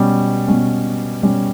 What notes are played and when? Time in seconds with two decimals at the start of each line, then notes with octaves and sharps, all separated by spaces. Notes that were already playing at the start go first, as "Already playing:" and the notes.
Already playing: B2 G3 C#4
0.47 B2 G3 C#4
1.22 B2 G3 C#4